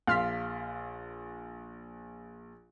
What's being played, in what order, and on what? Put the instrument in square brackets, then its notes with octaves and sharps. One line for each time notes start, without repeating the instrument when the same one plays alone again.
[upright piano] A#1 C6 B6 [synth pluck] F5 F6